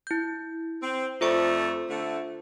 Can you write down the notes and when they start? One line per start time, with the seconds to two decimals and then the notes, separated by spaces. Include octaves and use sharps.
0.07 E4 G6
0.81 C4
1.21 F2 A3 F4 C5 D5 C#6
1.89 D3 A3